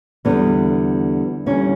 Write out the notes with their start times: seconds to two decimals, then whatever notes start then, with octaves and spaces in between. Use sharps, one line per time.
0.25 E2 D3 G3 B3
1.46 E2 D3 G3 C#4